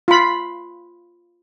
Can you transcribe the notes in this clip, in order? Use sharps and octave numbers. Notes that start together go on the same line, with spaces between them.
F4 B5